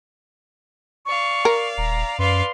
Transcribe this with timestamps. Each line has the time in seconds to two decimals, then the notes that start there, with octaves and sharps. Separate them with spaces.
1.06 D5 F5 C#6
1.45 A#4
1.78 D#1 A#5
2.19 F#2 B4 D5 F5 C6